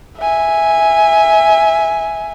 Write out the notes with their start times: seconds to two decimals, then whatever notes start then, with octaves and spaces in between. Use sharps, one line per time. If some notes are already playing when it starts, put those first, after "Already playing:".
0.18 E5 G#5